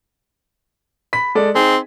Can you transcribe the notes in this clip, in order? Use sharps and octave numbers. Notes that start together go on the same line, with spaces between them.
B5 B6
G#3 A4 D5
C4 D#4 G#4